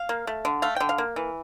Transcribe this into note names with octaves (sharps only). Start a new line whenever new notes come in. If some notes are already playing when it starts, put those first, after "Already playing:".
Already playing: F5
A#3
A3
D3
A3 F5
D3 G5
F5
A#3
E3